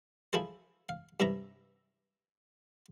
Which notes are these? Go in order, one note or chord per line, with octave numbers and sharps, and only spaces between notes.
F3 E4 G#4 A4 C5
F5
G2 C3 E4 E5 A#5